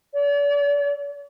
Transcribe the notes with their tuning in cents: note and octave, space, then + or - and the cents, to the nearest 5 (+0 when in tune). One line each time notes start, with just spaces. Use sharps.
D5 -40